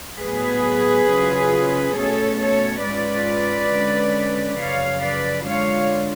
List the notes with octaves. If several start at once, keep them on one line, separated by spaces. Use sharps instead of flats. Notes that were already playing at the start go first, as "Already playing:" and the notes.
A2 F#3 B3 G#4 B4
C#3 F#3 C#4 F4
B2 A3 C#4 A4 C#5
A4 C#5
G#2 G#3 C#4 F4 B4 D5
D3 G#3 C#4
F#2 C#3 F3 C#5 F5
B4 D5
D3 G#3 D4 F4 C#5 F5